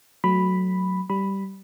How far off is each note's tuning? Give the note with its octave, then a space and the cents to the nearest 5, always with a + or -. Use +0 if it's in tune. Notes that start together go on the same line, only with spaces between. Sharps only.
F#3 +0 A3 +0 B5 +0
G3 -10 B5 +0